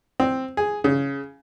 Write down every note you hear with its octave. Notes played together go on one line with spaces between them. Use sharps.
C4
G#4
C#3